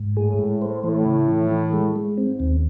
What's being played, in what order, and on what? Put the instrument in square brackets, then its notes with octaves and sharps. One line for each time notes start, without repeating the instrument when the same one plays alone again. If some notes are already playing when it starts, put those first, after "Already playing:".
Already playing: [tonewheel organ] G#2
[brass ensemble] A2 [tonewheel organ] G#4
[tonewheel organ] G#3
C5
[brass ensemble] A2 [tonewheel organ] E3
[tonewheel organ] C#3
E3
E3
G#3
G#3
[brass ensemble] G#2 [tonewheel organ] C4
[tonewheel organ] D#2